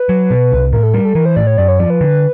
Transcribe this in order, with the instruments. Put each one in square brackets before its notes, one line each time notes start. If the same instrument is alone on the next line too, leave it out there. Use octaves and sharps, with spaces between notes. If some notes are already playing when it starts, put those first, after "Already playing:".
Already playing: [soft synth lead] B4
[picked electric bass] F#3
B2
C2
[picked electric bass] A2 [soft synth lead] A#4
[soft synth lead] A4
[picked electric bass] G3 [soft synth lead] A#4
[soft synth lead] A4
[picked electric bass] E3 [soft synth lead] A#4
[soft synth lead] C5
[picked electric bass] A2 [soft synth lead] D5
[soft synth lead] C#5
[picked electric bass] F#2 [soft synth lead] D5
[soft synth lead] C#5
[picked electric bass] F3 [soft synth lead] D5
[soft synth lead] B4
[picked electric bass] D3